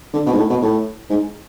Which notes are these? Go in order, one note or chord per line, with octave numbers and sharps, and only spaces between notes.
D3
B2
G#2
A2
B2
A2
G#2